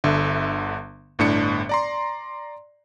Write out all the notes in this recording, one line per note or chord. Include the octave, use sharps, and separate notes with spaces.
G1 D3 E5
G1 A2 D4 C#7
D5 A#5 C6